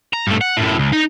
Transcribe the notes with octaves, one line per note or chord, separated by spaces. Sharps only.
A#5
G2 A3
F#5
F#2 A2
C#2
D#4 A#5